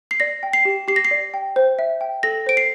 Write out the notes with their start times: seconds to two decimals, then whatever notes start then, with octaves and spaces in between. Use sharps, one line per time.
0.11 C7
0.20 D5 A#6
0.43 G5
0.53 C7
0.65 G4
0.88 G4 C7
0.96 A#6
1.05 C7
1.11 D5
1.34 G5
1.56 C5
1.79 E5
2.01 G5
2.23 A4 A#6
2.46 C5 D7
2.57 C7